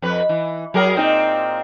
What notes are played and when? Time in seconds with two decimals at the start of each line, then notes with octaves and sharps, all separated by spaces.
0.02 F2 B4
0.29 E3
0.74 F#3 G#4 A#4
0.96 A#2 C4 D#4